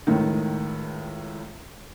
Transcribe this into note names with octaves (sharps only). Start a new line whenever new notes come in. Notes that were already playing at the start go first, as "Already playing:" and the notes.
C#2 A2 D#3